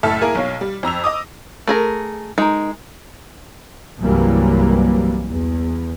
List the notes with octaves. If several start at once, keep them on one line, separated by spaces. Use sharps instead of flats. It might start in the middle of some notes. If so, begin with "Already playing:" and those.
F#1 A2 A4 E5 A5 F6
A#3 E4 G#4 A#4 G#5
B1 C#5 F5
G3
F2 A#5 E6 F7
D#5 D6 D#6
A3 G#4 A#4
G#3 D#4 A#4
C2 G2 E3 F#3 G3 A#3
E2